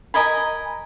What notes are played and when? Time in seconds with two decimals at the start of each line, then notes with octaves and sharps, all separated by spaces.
0.14 A#4 D#5 G#5 B5